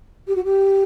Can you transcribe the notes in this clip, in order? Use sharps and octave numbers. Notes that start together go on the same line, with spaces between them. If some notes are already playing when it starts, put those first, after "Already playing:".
G4
F#4
G4